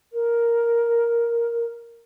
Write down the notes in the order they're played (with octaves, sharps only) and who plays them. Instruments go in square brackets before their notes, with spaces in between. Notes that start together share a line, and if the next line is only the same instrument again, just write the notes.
[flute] A#4